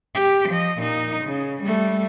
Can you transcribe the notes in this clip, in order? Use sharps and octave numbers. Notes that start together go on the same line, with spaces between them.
G4
F3 D#5
A#2 D#4
C#3
G3 A3